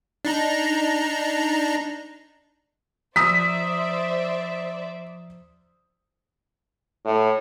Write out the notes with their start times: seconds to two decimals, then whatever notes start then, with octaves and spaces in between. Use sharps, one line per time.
0.25 D4 D#4 A#5
3.16 F3 C5 D5 E5 A#5 D#6 E6 B6
7.05 A2